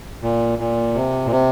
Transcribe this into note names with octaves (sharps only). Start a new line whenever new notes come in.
A#2
A#2
C3
A#2
C3